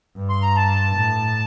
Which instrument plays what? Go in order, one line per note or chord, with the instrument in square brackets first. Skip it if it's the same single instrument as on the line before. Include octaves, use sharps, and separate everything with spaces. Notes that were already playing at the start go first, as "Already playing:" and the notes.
[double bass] G2
[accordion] C6
A#5
A5
[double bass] A2